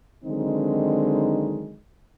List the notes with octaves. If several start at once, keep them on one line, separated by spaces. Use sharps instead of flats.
D3 D#3 F#3 G#3 C4 D#4